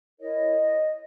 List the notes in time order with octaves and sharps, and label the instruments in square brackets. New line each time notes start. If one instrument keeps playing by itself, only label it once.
[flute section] E4 A#4 C#5 D#5